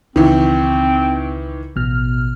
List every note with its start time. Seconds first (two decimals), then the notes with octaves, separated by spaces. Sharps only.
0.16 C#2 D#3 E3 C4
1.76 A1 B2 F6